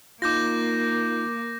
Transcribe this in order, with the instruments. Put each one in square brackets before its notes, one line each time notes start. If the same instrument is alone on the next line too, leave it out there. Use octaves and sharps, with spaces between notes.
[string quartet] A#3 [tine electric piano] D#4 F4 [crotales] D6 G6 A#6